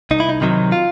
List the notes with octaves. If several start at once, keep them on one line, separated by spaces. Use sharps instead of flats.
C2 D#4
E4
D#4
C3 D#3 F#3 D#4
F4